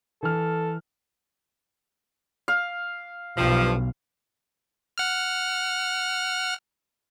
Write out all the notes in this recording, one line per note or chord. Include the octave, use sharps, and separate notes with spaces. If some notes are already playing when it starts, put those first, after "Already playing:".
E3 A4 F6
F5
B1 G2 F3
F#5 F6